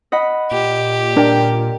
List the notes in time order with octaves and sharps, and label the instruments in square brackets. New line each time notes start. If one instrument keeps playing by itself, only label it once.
[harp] D#5 F#5 B5
[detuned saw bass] A#2 [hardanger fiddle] G4
[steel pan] D4 [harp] A#4 G5